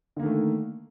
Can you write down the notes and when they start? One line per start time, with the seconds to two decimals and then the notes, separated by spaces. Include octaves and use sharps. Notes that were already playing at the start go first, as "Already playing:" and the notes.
0.17 D3
0.19 A#3
0.22 D#3
0.25 A3